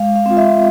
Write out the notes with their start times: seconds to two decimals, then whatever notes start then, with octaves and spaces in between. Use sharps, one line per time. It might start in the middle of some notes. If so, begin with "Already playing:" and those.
Already playing: G#3 F5
0.16 F5
0.26 C4 F4
0.37 E5